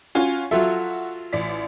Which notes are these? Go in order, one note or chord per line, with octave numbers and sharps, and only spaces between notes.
C#4 F4 F#4 G#5
F#3 F4 F#4 A4 E5
A1 D5 B6